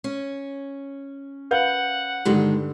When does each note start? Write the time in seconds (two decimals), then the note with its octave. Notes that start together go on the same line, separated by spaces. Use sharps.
0.04 C#4
1.51 B4 F5 F#5 G6
2.25 G2 D3 D#3 G3 G#3 D4